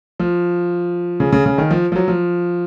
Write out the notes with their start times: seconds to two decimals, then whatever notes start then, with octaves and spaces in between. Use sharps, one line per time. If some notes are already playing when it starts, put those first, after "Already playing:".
0.20 F3
1.20 C#3
1.32 C#3
1.46 C#3
1.58 D#3
1.71 F3
1.92 F3
1.96 F#3
2.08 F3